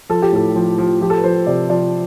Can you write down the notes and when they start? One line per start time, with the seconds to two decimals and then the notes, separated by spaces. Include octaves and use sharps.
0.09 F3 A4
0.22 G4
0.32 A2 A4
0.56 F3
0.78 F3
1.01 F3 G4
1.10 A4
1.18 B4
1.24 F3 C5
1.47 C3 D5
1.69 F3 D5